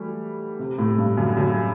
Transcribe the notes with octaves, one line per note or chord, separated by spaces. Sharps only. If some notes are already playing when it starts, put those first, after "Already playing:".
Already playing: E3 F#3 G3 A3
C3
A2
G2
F#2
F#2